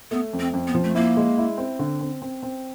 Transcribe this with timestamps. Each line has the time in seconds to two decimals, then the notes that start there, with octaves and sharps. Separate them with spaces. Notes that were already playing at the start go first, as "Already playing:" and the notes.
0.11 A3 B3
0.33 F2
0.40 C4
0.53 F2
0.67 B3
0.74 F3
0.84 A3
0.95 A#3 E4
1.17 G#3
1.38 E4
1.58 C4
1.79 D3
2.01 C4
2.22 C4
2.43 C4